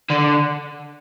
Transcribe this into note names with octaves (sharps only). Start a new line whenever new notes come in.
D3